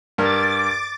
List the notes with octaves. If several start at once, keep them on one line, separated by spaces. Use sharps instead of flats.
G2 A#4 D6 A6